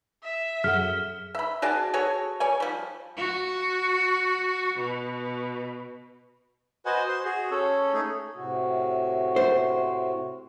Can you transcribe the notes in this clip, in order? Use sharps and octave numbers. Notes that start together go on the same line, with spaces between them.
E5
F#2 G#4 A4 F#5 F6
E5 B5
F#4 G#4 D5 A5
F#4 G#4 A4 C#5
C#5 D5 G#5
F3 G3
F#4
B2
F#4 B4 C5 D#5 F#5 G#5
C5 C6
F#4 G#4
C#4 A4 C#5
A3 D#4 G#4
A2 C3 F#4
C5